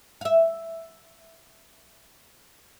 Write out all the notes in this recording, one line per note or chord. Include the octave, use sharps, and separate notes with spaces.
E5 F5